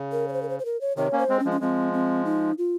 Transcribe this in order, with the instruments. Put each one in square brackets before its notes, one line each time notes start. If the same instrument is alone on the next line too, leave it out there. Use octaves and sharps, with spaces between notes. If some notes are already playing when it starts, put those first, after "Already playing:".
Already playing: [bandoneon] C#3
[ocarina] A#4
C#5
C5
A#4
C5
C5
A#4
C#5
[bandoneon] C3 D#3 [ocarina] C#5
[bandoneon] A#3 C#4
[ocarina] C5
[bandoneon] G#3 C4
[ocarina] C#4
[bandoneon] F3 G#3
[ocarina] C#4
[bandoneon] F3 G#3 [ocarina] C4
[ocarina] C4
D#4
F4